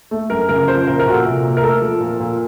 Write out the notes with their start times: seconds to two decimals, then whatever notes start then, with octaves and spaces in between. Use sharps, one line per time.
0.11 A3
0.30 F#2 A#4
0.49 C#3 A#4
0.68 F3 C5
0.87 A#2 A#4
0.99 A#4
1.06 A#2 F#4
1.13 A4
1.25 C3
1.44 A#3
1.57 A#4
1.63 A3 A4
1.82 F3
2.01 A#2
2.20 A#2